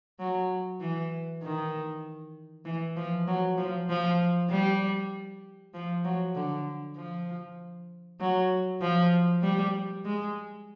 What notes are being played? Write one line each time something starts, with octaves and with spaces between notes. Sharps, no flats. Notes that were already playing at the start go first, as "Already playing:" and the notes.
F#3
E3
D#3
E3
F3
F#3
F3
F3
G3
F3
F#3
D3
F3
F#3
F3
G3
G#3